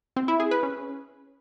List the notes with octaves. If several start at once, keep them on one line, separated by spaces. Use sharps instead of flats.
C4
E4
G#4
B4
C#4